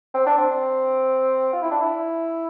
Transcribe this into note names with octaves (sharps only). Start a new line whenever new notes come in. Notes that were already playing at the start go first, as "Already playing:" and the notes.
C4
D4
C4
F4
E4
D4
E4